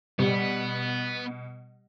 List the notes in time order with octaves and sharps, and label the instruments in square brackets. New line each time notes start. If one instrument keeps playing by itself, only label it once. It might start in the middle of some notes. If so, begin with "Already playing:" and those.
[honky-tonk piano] B2 [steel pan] G3 [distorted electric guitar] B3